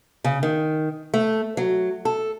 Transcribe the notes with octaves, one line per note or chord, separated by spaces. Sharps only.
C#3
D#3
A3
F#3
A4